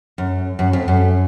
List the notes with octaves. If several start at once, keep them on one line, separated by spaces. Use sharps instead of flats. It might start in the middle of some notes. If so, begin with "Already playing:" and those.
F#2
F#2
F2
F#2